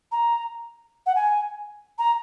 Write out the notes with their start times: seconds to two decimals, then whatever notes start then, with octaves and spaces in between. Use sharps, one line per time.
0.12 A#5
1.06 F#5
1.15 G#5
1.98 A#5